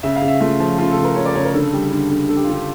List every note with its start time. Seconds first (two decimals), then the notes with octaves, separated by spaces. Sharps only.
0.03 C#3 E5
0.16 F5
0.22 C#3
0.28 E5
0.40 A3 F4
0.60 F3
0.78 C#3 F4
0.91 A4
0.97 C#3
1.04 A#4
1.16 C#3 C#5
1.25 D5
1.35 C#3 C#5
1.45 A#4
1.54 D3 A4
1.73 G3
1.92 D3
2.11 D3
2.29 D3 A4
2.37 G4
2.44 F4
2.49 D3 G4